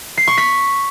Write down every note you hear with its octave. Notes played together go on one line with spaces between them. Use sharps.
C7
C#6
B6